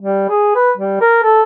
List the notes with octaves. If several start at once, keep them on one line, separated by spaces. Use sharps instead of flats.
G3
G#4
B4
G3
A#4
A4